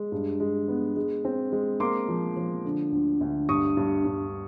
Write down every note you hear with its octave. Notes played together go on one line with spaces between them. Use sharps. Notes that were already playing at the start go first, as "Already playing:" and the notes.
Already playing: G#3
G2
G#3
B3
G#3
C4
G#3
A#3 C6 D6
F3
F3
D3
D2
D2
G2 C#6 D#6
G2
G2